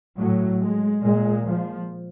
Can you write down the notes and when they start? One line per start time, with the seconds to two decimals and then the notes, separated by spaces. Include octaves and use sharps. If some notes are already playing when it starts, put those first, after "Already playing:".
0.17 A2 F#3
0.60 G#3
1.02 A#2 G#3
1.45 F3